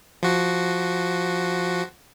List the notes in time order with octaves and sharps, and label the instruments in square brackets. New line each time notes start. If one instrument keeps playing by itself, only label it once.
[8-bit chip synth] F3 F#4